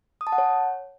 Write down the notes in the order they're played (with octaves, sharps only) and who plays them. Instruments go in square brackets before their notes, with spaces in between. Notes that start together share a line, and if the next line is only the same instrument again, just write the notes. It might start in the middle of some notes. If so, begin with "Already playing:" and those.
[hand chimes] D#6
A5
F#5
C#5